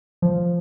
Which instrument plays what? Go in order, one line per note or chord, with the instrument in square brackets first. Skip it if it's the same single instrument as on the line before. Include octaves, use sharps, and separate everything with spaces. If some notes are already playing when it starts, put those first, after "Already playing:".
[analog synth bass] F3